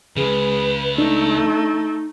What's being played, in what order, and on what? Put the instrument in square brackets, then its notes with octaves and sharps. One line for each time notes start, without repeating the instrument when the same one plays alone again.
[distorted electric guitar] C#2 C#3 [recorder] G#4 [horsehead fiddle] B4
[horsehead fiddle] A3 [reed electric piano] D4 [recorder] D#4